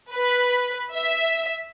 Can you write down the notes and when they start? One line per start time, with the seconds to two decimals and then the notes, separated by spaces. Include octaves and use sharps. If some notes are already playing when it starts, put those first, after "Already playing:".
0.13 B4
0.94 E5